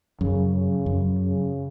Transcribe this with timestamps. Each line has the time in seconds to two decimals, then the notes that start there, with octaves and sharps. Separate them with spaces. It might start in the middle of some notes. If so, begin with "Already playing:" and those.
0.21 F#2 C#3
0.53 C#3
0.86 F#2
1.19 C#3